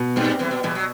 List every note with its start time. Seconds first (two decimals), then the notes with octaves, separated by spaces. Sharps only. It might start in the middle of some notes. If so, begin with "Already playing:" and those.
Already playing: B2
0.16 G2 G3 C4
0.39 E2 E3 G3
0.51 B2
0.63 E2 B2 E3
0.75 F#3